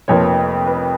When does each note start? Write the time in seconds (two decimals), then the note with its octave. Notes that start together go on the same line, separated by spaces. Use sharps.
0.08 F1 F2 F3 A#3 C#5
0.67 B4